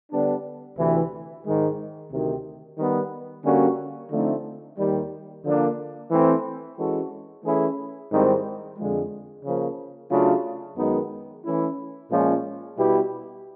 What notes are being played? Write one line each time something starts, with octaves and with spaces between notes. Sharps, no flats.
D3 G3 B3 D4
D2 C3 E3
G#2 D#3 G#3
D2 C3 D#3
D#3 G3 B3
D3 G3 A#3 C#4 F#4
D3 F3 A3 C4 D#4
D#2 D#3 G3
D3 F3 A#3 D4
E3 A3 C4
E3 G#3 C#4 F#4 A4
E3 A3 C#4 E4 G#4
G#2 D#3 G3 C4 E4
F2 D3 F3 G#3
C#3 F3 A#3
C#3 F#3 A3 D4 F4
F#2 D#3 G#3 B3 D#4
E3 A3 C#4 E4
A#2 F3 G#3 C#4
B2 G3 B3 E4 G4